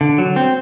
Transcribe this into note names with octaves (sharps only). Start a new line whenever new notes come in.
D3
F#3
C4